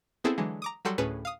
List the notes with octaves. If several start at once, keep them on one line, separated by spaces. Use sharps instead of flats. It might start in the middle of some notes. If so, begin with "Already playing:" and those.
B3 C4 E4 G#4 A4
D3 E3 F#3 G#3
A#5 D6 D#6
F#3 G3 F#4 A4 G5 C6
D2 A2 C#4 G#4 B4 E7
F5 D#6